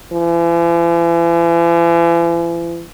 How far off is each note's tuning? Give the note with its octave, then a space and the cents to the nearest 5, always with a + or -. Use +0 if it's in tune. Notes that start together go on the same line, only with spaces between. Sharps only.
E3 +45